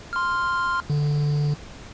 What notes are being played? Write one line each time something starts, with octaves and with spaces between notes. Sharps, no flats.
C6 F6
D3